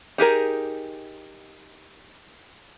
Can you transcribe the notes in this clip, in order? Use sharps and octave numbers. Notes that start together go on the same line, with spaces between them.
D#4 G4 G#4 A#4